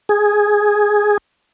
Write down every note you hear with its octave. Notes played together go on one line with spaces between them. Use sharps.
G#4